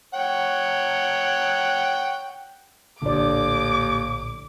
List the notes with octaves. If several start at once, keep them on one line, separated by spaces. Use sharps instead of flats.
C#5 F#5 G5
A#1 D#2 A2 D3 D5 D6